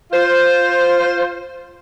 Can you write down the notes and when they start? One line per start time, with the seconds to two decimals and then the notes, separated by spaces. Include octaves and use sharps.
0.12 F4 C5